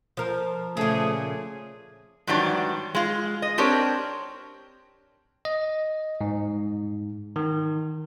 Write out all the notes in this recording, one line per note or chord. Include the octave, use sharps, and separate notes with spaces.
F3 A#4
A#2 C#3 A3 G#4
G#2 D#3 E3 F#3 G3 D4
G#3 F4
D#5
C4 D4 G4 A#4 C#5
D#5
G#2
D#3